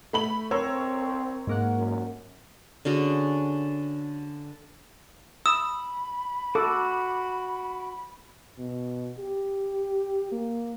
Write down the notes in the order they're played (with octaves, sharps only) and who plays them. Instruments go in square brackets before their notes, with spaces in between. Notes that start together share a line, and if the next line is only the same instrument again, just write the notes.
[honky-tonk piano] A3 B5 F#7
[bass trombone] C4 [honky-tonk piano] A#4 C#5 E6 [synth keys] C5
[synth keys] G#2 A#3 F#5
[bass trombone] F#2
[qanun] D3 C#4 F#4 G#4
[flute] B5 [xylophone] D#6 [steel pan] E6
[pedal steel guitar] F#4 D6 [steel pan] A4
[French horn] B2
G4
A#3